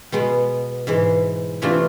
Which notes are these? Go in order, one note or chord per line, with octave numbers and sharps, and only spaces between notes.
B2 G#3 B3
G#2 E3 G#3
C3 E3 A3 D4 F4